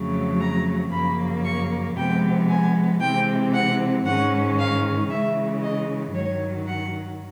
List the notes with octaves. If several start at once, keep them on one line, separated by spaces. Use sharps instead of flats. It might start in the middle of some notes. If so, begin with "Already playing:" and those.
Already playing: F2 C#3 F#3 A3
A#5
F#2 C#3 F3 A#3 B5
C#6
C3 F3 G#3 B3 G5
G#5
C3 E3 G#3 C4 G5
F#5
G#2 D#3 G#3 C#4 F#5
F5
C#3 E3 G#3 E5
D#5
G2 D#3 F#3 C#5
F#5